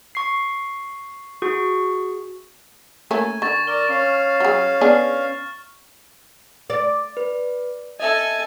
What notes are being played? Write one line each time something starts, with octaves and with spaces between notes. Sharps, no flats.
C#6 C7
F#4 G#4 C#6
A3 A#3 C#4 G#5
D3 C#6 A6
A#4 D5 G7
C#4 F5
F#3 G#4
B3 D4 G#4 F6
D5
B4
A4 D#5 E5 G#5